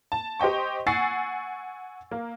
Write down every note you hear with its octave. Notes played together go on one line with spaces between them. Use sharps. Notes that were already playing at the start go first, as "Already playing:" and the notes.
A5
G4 C5 D#5 G5 C#6
F#5 G#5 C#6 E6 A6 C7
A#3